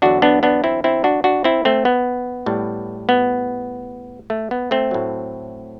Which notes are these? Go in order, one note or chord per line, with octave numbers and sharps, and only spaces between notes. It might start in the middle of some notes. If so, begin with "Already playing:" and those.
E2 D3 F#3 D4 F#4
B3 D4
B3 D4
C4 E4
C4 E4
D4 F#4
D4 F#4
C4 E4
A3 C4
B3
A2 G3
B3
A3
B3
A3 C4
A2 F#3